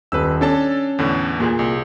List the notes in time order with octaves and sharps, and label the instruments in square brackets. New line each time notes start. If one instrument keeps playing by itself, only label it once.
[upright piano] D#1 [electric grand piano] B4 E6
[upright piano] C#4 [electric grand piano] D4 A4 A5
[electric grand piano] E2 A2 D3
[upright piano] A#2 G#4
[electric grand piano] C2